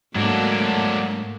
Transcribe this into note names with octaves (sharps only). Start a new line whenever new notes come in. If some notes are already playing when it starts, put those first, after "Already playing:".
G#2 F#3 A3 A#3 D4